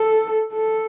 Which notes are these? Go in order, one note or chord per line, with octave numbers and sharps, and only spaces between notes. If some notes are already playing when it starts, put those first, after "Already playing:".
Already playing: A4
A4